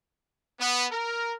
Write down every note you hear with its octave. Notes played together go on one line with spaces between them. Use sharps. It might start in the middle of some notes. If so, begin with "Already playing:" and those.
B3
A#4